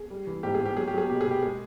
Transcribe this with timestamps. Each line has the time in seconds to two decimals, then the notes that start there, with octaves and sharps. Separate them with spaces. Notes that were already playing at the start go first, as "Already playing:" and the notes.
Already playing: G#4
0.10 G3
0.27 E3
0.43 G#2 G4
0.54 G#4
0.60 G#2
0.66 G4
0.76 F#3 G#4
0.88 G4
0.93 F#3 G#4
1.10 B2 G4
1.21 G#4
1.27 B2 G4
1.42 G#3 G#4